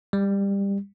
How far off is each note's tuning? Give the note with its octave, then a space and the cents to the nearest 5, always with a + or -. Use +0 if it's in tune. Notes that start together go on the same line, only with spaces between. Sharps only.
G3 +20